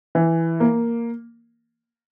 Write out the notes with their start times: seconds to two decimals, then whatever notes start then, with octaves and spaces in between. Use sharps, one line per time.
0.15 E3
0.60 A#3